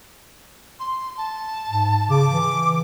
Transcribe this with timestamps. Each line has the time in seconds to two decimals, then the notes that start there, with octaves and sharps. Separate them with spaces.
0.80 C6
1.17 A5
1.69 G#2
2.10 C#3 D6
2.30 E3